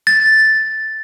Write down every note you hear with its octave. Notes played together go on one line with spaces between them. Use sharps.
A6